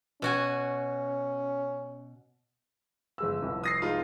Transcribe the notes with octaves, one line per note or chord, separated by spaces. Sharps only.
B2 C#4 F#4 G#5
G1 G#3 E6
F1 C2 F2
D#6 A#6 C7
G#3 D#4 F4